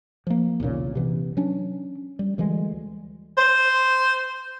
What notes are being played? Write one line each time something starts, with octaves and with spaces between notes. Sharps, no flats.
F3 A#3
B1 E2 A#2 C#3
C3 E3 B3
F#3 C#4 D4
G3
D2 E3 G3 G#3
C5